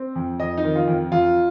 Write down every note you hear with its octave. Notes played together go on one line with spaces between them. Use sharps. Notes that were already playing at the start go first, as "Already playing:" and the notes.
Already playing: C4
F2
F2 D#5
D#4
D#3
F4
F2
F2 F4